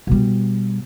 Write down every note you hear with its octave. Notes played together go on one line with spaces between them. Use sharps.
B2 G3